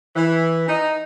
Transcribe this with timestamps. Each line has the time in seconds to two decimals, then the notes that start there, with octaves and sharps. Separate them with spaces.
0.15 E3
0.68 D#4